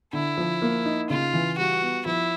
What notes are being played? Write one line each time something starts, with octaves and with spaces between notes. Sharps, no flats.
D3 E4
F3
A#3
D#4
C#3 F4
E3
G3 F#4
B3
F3 E4